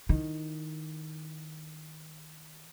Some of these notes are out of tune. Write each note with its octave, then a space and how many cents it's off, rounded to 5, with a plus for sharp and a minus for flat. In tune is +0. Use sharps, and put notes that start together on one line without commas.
D#3 +0 E4 +0